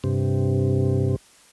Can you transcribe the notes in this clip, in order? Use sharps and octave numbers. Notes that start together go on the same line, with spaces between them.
G2 C3